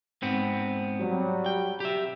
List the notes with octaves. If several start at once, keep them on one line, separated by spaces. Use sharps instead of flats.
G#2 B3 C4
F#3 G3
G5
G4 E5